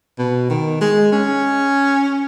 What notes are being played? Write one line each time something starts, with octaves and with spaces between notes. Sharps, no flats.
B2
D#3
G#3
C#4